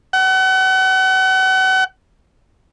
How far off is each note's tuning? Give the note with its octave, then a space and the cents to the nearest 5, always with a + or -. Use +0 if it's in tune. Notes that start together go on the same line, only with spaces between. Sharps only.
F#5 +35